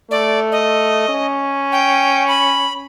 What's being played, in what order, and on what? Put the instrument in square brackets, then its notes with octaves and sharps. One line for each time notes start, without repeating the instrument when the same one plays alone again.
[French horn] A3 [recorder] D5
[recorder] D#5
[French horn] C#4
[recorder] G5
B5